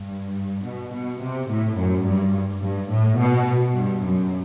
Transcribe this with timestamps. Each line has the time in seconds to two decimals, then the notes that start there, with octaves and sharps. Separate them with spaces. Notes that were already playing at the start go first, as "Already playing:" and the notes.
Already playing: G2
0.65 B2
0.93 B2
1.22 C3
1.50 A2
1.78 F#2
2.06 G2
2.61 G2
2.90 A2
3.18 B2
3.74 G2
4.02 F#2